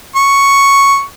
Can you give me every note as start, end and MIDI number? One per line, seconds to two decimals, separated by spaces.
0.15 1.02 85